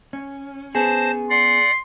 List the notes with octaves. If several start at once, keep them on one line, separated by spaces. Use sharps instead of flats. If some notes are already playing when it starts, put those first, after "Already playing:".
C#4
B3 C#4 G#4 C5 A5 A#6
D5 F#5 C6